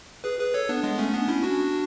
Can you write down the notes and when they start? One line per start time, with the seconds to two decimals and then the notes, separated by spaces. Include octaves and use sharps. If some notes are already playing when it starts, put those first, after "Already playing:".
0.24 G#4 B4
0.39 G#4 B4
0.54 A4 C#5
0.69 B3 D4
0.83 G#3 B3
0.98 A3 C#4
1.13 B3 D4
1.28 C#4 E4
1.43 D4 F#4